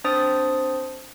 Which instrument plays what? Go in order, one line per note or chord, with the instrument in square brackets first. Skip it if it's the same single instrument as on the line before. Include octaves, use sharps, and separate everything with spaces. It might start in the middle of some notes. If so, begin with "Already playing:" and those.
[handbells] C4 D4 C5 D#6 A6